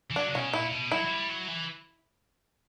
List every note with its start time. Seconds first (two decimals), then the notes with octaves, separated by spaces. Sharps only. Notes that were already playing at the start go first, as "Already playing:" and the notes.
0.11 E3
0.16 F#3 D4
0.29 C#3
0.35 B2 C#4
0.53 A#2 E4
0.72 B2
0.91 F#3 E4
1.05 F#3
1.10 G3
1.29 F#3
1.48 E3